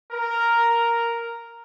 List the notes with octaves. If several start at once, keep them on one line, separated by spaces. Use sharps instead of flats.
A#4